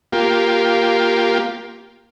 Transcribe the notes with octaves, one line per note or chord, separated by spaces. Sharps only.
A#3 F4 G4